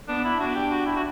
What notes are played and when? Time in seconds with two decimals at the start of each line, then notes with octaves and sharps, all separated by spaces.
0.08 B3 D4
0.24 E4
0.40 D4 F#4
0.55 G4
0.71 F#4
0.86 E4
0.96 F#4